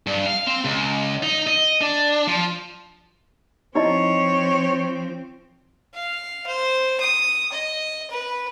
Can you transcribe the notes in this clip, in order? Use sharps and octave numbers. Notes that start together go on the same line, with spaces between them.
G2
F5
C4
C#2
D#4
D#5
D4
F3
F3 C4 D#4 E4 C#5 D#5
F5
C5
D#6
D#5
B4